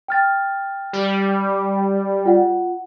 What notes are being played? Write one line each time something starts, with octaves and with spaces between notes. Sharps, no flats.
G5 F6 A6
G3
F4 F#5